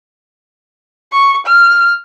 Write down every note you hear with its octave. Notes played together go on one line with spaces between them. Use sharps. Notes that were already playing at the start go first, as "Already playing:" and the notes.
C#6
F6